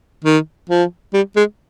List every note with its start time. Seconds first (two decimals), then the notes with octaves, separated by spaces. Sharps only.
0.24 D#3
0.70 F3
1.14 G3
1.36 G#3